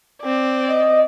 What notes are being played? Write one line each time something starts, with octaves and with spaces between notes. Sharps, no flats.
C4 D5
D#5